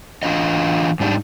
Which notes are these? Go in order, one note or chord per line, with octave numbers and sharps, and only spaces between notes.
E3 D4 F4 D#5
G#2 G3 D4 D#4